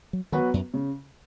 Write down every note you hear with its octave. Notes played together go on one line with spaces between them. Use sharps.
F#3
D#3 F#3 B3 F#4 B4
F#2
C#3